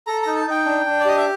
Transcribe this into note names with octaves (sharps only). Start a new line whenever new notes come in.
A4 A#5
D#4 A#5
A5
D#4 G5
D4
D4
D5
G4 D#5
E5